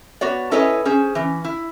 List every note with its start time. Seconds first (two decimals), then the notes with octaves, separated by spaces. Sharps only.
0.21 B3 F#4 C#5 D5
0.51 C#4 E4 A4 B4 C#5 D#5
0.85 C#4 G#4 C5
1.15 E3 C#4
1.45 E4